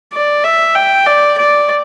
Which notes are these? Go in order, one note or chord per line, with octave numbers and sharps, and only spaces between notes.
D5
E5
G5
D5
D5